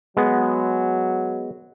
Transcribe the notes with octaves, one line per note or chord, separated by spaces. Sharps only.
F#3 G#3 B3